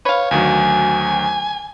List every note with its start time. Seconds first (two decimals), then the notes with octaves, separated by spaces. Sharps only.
0.05 B4 C#5 F5
0.31 D2 D#3 F#3 G#5